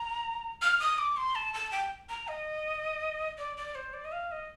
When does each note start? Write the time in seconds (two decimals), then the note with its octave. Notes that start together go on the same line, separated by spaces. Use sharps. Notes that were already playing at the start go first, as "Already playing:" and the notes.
Already playing: A#5
0.62 F6
0.79 D#6
0.98 D6
1.17 C6
1.35 A5
1.54 A5
1.72 G5
2.09 A#5
2.28 D#5
3.38 D5
3.57 D5
3.75 C5
3.93 D5
4.05 D#5
4.12 F5
4.31 D#5